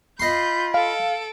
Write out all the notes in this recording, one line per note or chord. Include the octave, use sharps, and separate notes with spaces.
F4 D#5 B5 C6 G6
A4 F5 D7